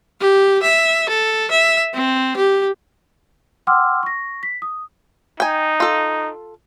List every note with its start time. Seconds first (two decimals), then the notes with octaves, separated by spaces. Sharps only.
0.20 G4
0.62 E5
1.09 A4
1.51 E5
1.94 C4
2.37 G4
3.67 F#5 G5 C6 D6 E6 F6
4.03 C#6 A#6
4.43 B6
4.62 D#6
5.40 D#4 G5 G#5
5.80 F4 A4